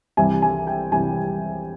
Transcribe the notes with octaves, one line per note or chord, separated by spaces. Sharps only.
C2 C3 E3 G3 G#5
G#5
G5
C2 C3 E3 G3 G#5